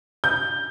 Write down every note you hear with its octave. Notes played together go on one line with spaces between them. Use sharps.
G6